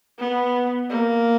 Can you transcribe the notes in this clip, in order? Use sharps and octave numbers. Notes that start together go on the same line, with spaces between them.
B3
A#3